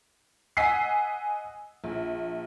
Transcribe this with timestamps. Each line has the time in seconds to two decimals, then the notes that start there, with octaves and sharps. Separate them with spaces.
0.57 D#5 F#5 G#5 E6 B6 C7
1.84 A#1